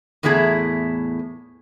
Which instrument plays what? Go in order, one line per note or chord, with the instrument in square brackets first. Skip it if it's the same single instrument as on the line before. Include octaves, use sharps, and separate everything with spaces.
[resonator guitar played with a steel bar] E2 A2 B3 E4 G#4 A#5